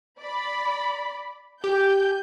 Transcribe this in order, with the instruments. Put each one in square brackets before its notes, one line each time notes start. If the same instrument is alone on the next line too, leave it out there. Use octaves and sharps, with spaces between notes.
[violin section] D5 B5
[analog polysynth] G4 [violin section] G#5 G6